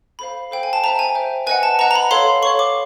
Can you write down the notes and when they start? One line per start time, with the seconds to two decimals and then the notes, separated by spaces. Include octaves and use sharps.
0.19 A4 C5 F5 B5
0.51 A4 C5 F5 G5
0.63 G#5
0.73 A5
0.83 C5 E5 G5 A#5
0.99 G#5
1.15 C5 E5 G5
1.47 B4 D#5 F#5 G#5
1.63 A5
1.79 B4 D#5 F#5 A#5
1.91 A#5
1.96 B5
2.11 A4 C#5 F5 C6
2.42 A4 C#5 F5 C#6
2.59 D6